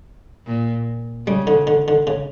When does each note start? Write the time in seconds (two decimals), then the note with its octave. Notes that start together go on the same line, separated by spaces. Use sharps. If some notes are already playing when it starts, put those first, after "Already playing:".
0.47 A#2
1.27 C#3 G3
1.47 D3
1.67 D3
1.88 D3
2.07 C#3